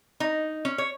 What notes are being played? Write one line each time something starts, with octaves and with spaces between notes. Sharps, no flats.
D#4
C#4
C#5